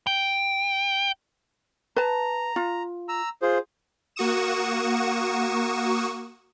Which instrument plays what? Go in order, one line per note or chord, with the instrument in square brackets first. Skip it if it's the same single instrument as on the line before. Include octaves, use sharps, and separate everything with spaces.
[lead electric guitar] G5
[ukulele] B4 A5 [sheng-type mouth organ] A#5
[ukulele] F4
[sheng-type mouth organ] A#5 E6
F4 G#4 C5
[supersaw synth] A#3 F#4 C#6 D#6 E7